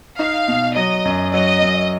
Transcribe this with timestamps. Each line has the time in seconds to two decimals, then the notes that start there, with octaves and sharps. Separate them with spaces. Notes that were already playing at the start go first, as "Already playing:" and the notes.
0.19 D#4 F5
0.48 B2
0.76 F#3 D#5
1.05 F#2
1.33 F#3 D#5
1.62 F#2